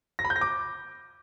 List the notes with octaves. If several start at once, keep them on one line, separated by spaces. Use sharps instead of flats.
A#6
B5
G6
A#6
D6